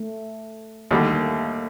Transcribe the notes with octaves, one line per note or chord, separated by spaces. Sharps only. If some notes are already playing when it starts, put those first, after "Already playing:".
Already playing: A3
D#2 D3 G3 A#3
A3
A#3